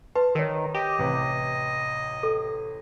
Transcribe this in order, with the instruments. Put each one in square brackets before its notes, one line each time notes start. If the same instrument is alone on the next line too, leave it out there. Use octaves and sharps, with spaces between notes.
[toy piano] B4 [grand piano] A5 C6
[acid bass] D#3 [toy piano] A#4 C#5
[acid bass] G4 [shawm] D#5
[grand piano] A1 C3 B4
[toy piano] A4